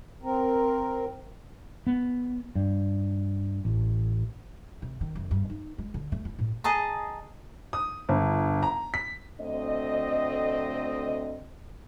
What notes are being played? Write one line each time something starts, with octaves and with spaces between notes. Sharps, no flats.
C4 A#4
B3
G2
A1
C3
D#3
F#1
G2
D#4
G#3
D3
A3
E4
A2
G#4 D#5 A5 A#5
D#6
G1
A#5
B6
D2 A3 C4 D#5